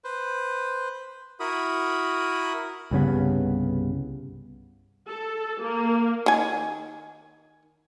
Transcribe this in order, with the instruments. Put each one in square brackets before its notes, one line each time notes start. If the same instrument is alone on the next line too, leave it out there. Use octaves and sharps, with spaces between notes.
[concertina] B4 C5
E4 F#4 A#4 B5 D#6
[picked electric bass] C2 G2 C#3 B3
[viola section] A4
A#3
[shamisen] D#3 G#5